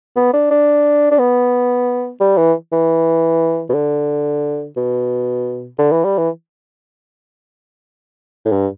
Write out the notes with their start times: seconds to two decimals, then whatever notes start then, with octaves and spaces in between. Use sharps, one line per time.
0.16 B3
0.33 D4
0.51 D4
1.11 D4
1.19 B3
2.20 G3
2.38 E3
2.72 E3
3.69 B2
3.74 D3
4.76 B2
5.79 D3
5.91 E3
6.04 G3
6.18 E3
8.45 A2
8.52 G2